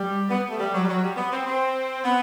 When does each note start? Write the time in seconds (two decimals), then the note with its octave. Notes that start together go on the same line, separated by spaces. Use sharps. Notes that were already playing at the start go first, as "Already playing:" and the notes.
Already playing: G3
0.30 B3
0.50 A3
0.59 G3
0.74 F#3
0.83 G3
0.88 F#3
1.03 G3
1.17 B3
1.32 C4
1.47 C4
2.05 B3